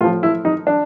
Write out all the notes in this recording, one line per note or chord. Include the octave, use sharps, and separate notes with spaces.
A2 F3 F4
E4
D#4
D4